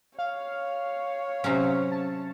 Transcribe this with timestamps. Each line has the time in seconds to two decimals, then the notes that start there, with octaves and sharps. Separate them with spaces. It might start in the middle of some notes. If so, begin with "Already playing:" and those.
0.19 C#5 F5
1.44 C3 F#3 C#4
1.92 A5